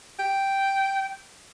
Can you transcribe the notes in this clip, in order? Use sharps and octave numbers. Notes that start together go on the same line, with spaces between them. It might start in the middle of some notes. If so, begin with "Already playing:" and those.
G5